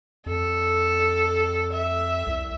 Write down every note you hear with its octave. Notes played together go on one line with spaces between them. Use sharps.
F2 A4
E5
C2